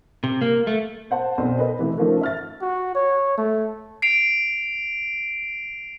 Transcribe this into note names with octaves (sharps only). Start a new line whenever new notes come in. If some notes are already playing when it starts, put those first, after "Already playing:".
C3
A#3
A3
C5 F#5 A5
B1 C4 C5 D5
A4 B4 D#5
C3 E3 A3
D#3 F3 A3 C#4
E5 F6 A6
F#4
C#5
A3
C7 D7 F7